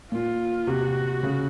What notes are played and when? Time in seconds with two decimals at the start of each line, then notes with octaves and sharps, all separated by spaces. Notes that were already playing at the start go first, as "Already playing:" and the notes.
0.11 A#2 F4
0.67 C3 F#4
1.23 C#3